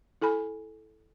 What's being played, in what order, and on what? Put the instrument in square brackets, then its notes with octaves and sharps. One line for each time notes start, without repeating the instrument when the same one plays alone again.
[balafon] E4 A4 G#5 B5